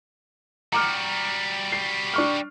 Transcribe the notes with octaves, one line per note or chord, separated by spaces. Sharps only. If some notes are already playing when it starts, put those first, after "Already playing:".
G3 F#4 A#5 D6 F6
C7
D4 C#6 F6